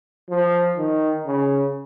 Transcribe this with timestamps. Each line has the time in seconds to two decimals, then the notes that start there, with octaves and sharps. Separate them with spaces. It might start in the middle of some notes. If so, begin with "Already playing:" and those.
0.30 F3
0.77 D#3
1.26 C#3